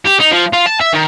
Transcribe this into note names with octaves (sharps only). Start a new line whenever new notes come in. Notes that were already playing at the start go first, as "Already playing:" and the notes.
G4
D#4
F3
F4
A5
E5
D#3